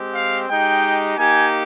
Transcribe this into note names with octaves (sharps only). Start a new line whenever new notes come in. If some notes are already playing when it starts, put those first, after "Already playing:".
Already playing: G#3 C4 G4
F5
G#3 D#4 G4 G5
A#3 D#4 G4 G#5